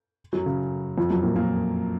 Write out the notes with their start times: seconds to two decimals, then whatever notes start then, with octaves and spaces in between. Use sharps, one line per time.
0.33 F#2 F#3
0.46 C#3
0.98 F2 F3
1.10 F#2 F#3
1.23 A#2 A#3
1.36 A#2 A#3